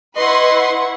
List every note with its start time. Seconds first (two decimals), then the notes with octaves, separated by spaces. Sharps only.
0.16 E4 B4 D#5 F#5 C6 C#6